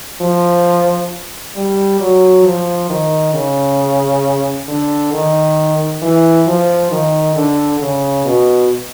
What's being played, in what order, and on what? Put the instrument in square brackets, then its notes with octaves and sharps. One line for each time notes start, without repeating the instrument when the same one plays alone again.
[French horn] F3
G3
F#3
F3
D#3
C#3
D3
D#3
E3
F3
D#3
D3
C#3
B2